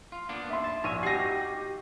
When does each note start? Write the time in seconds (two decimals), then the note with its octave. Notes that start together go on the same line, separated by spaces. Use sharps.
0.12 F4
0.29 A#3 B3 D4
0.50 E5 C6
0.64 A5
0.84 A#1 C#5 D#7
1.03 D#4 F#4 G4 A#6 C7